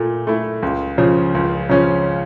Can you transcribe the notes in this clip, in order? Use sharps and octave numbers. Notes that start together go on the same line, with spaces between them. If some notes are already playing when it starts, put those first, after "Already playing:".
Already playing: A#2 A3
A3 E4
C#2
C#3 F3 C#4
C#2
C#3 F3 C#4